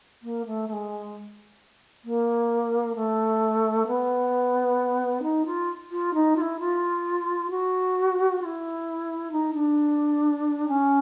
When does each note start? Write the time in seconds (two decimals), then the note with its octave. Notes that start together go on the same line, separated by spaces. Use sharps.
0.22 A#3
0.46 A3
0.68 A3
0.72 G#3
2.05 A#3
2.95 A3
3.87 B3
5.22 D#4
5.46 F4
5.91 F4
6.14 D#4
6.36 F4
6.41 E4
6.59 F4
7.50 F#4
8.41 F4
8.45 E4
9.31 D#4
9.54 D4
10.68 C#4